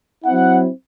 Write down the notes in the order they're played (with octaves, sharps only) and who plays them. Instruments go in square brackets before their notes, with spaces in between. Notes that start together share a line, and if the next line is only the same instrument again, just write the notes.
[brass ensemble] F#3 C4 E4 F#5